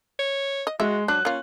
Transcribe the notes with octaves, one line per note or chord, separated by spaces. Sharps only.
C#5
D#5
G#3 F#4 E5
F#3 D4 F#6
A#3 C#4 F4